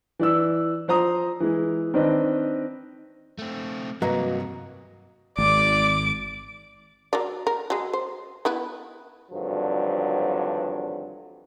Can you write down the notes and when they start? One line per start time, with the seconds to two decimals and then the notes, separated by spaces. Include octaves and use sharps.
0.19 E3 D5 E6
0.88 F3 C5 A#5 D#6
1.40 E3 G#3
1.94 D#3 C4 D4 B4 D#5
3.39 A3 C4
4.02 G2 C3 F#3 A#3 B4 D#5 A#5
5.38 G#1 D5 D6
7.13 F#3 A#4 D5
7.47 A#4
7.70 F#3 G#3
7.93 C5
8.45 B3 E4 B4
9.31 G#1 G2 D3 F3 F#3